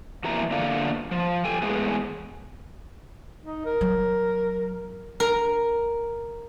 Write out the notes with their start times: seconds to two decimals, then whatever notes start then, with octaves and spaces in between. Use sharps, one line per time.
0.24 F2 B2 E3 A#3 A#5
0.51 E2 D3 A#3 D4 F4 A4
1.11 F3
1.45 A4 G5 G#5
1.62 E2 A2 C#3 G#3 B3 G#4
3.43 D#4
3.65 A#4
3.81 F#3
5.20 A#4